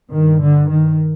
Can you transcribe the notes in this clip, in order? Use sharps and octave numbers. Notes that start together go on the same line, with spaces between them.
G2 D#3
D3
D#3